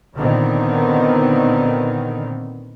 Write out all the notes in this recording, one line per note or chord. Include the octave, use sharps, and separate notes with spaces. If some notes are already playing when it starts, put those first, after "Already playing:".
A#2 D3 D#3 B3 C4